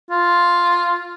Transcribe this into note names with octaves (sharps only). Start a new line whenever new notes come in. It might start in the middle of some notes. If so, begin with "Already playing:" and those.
F4